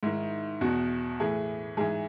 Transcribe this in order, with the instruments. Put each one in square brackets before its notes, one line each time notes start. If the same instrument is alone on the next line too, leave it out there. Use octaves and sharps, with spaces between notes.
[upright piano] G#2 D#3 E4
E2 B2 F#4
A2 E3 G#4
G#2 E3 G#4